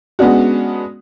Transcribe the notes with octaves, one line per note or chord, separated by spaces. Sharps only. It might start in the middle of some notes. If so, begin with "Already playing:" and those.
G#3 B3 C#4 D4 F#4